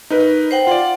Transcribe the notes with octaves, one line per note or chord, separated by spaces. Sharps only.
D#4 A#4 B4
C5 F#5 G5
F4 D5 F#5